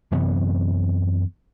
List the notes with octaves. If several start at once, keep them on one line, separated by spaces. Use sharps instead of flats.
F#2 C3 E3 B3